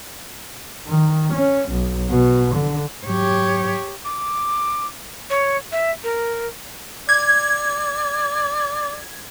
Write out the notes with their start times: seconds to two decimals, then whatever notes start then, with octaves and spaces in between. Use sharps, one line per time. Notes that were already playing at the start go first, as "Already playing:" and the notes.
0.87 D#3
1.34 C#4
1.70 B1
2.10 B2
2.55 D3
3.07 G#2 F#3 G4 C#5
4.05 D6
5.30 C#5
5.72 E5
6.03 A#4
7.09 D5 G#6